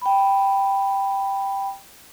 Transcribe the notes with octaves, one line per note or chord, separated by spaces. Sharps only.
G5 B5